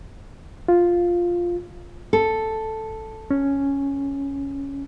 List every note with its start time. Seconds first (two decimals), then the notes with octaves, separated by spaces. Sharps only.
0.68 F4
2.13 A4
3.30 C#4